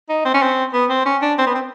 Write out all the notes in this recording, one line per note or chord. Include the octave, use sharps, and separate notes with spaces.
D#4
C4
C#4
C4
B3
C4
C#4
D4
C4
B3
C4